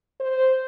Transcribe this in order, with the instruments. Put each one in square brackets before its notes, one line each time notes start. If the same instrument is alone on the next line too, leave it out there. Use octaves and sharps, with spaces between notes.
[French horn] C5